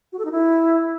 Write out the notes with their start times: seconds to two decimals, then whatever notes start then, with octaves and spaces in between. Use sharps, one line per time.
0.12 F#4
0.19 A4
0.25 D#4
0.31 E4